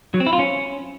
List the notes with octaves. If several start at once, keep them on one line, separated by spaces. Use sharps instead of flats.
F#3
C4
E4
F4
C#4